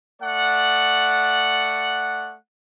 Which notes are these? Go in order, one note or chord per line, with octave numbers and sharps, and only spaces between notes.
A3 D5 F#5